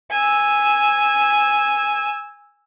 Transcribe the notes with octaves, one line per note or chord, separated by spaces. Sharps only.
G#5 E6